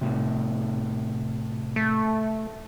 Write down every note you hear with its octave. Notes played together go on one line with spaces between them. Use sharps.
A2 C3
A3